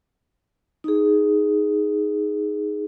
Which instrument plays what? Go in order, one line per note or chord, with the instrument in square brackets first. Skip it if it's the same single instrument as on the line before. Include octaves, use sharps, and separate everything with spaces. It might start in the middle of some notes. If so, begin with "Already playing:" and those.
[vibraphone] D#4 G#4